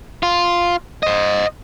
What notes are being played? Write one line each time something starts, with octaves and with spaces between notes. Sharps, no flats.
F4
C5 D#5